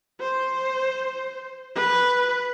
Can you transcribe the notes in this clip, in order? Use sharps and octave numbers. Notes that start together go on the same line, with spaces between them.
C5
B4